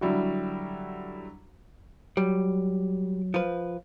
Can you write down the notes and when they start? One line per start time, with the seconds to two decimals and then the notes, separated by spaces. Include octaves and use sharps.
0.01 D3 F#3 G3 E4 F#4
2.17 F#3 G3
3.34 F3 B4